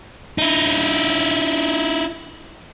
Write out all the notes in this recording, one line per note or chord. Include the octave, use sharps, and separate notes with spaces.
D#4 E4